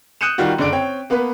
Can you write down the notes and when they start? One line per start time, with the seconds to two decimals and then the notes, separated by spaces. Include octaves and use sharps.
0.21 D#6 F#6 G6 C#7 D#7 E7
0.38 D#3 G3 F4 F#4
0.58 F#1 D3 D5 D7
0.72 C4 C#5 G5
1.10 A#3 B3 B4 B5